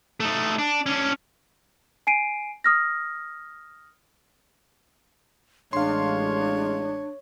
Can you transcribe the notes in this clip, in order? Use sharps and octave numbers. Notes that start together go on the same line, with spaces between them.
A3 D#4
D4
C#4 D4
G#5 C7 D7 D#7
D#6 F6 A#6
A1 G#3 D4 C#5 F5 C6